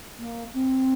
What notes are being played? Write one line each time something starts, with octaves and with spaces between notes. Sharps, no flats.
A#3
C4